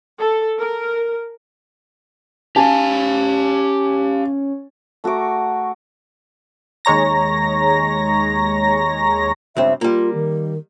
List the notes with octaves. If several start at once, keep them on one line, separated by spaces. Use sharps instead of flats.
A4
A#4
C#4 G4 F5 G#5 A5
A3 F#4 A#5 D6
D#2 G#3 C#5 A#5 A#6
C#2 G2 C4 E5
G3 A#3 F4
D#3